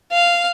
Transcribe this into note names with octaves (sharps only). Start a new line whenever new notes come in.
F5